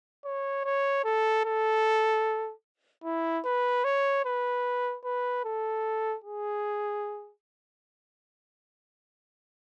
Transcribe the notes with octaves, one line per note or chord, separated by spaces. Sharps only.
C#5
C#5
A4
A4
E4
B4
C#5
B4
B4
A4
G#4